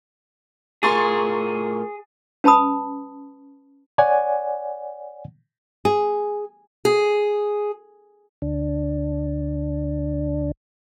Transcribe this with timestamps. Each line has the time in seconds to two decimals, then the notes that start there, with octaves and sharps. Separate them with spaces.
0.83 A2 F4 G#4 A#4 C6 C#6 A6
2.44 C#4 B4 A5 B5 D#6
3.98 C#5 D5 F#5 G#5
5.85 G#4
6.85 G#4
8.42 D2 D4